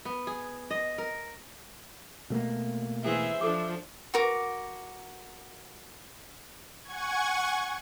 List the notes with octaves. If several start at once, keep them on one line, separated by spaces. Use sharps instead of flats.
B3
G#4
D#5
A#4
B2 A3 A#3
E3 G#4 C5 E5
F3 D4 A4 D6
F#4 A#4 D6
F#5 G#5 C#6 G#6